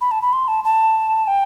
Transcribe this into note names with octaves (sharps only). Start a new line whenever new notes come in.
B5
A5
B5
C6
A5
A5
G5